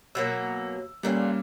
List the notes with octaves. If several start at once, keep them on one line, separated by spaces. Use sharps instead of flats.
B2 F#3 A#3 E6
A#2 D3 G3 A#3 C#4 F5